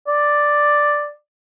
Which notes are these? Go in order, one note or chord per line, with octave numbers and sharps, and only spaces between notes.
D5